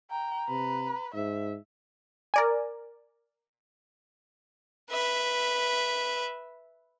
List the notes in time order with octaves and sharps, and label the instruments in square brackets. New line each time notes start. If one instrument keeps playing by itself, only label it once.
[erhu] G5 [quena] A#5
[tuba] C3 [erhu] B4
[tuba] G#2 [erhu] E5
[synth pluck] A#4 D5 G#5
[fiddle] B4 E5